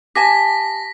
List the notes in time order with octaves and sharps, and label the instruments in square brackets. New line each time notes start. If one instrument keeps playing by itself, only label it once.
[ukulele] G4 G#5 A5 [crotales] A#6 B6